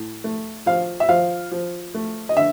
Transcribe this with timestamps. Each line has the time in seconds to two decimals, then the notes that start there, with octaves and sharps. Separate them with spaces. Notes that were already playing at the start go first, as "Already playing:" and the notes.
Already playing: A2
0.24 A3
0.66 F3 F5
1.00 E5
1.09 F3 F5
1.51 F3
1.94 A3
2.29 D#5
2.36 D3 E5